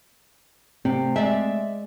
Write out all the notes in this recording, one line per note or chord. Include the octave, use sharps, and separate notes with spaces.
C3 A3 C4
G#3 D5 E5